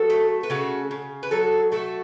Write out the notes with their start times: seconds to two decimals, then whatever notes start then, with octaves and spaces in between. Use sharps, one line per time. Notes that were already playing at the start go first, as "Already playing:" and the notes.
Already playing: F#3 F#4 A4
0.10 A3
0.43 B4
0.50 C#3 F#4 A4
0.91 C#3
1.23 B4
1.31 F#3 F#4 A4
1.72 A3 F#4 A4